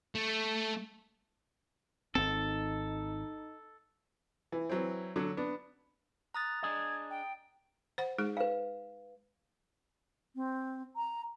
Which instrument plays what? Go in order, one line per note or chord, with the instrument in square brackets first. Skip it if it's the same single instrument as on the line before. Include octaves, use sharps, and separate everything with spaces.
[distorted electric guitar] A3
[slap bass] G#1 C4 [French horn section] D#4 [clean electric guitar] A4
[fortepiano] E3
E3 F#3 C4
D3 F#3
B3 D4
[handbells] A#5 D#6 A6 [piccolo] F#6
[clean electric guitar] D4 G#4 D#5 [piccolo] G#6
[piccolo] G5
[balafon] C5 F#5
G#3 D#4 G#4
[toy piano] B4 F5
[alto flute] C4
A#5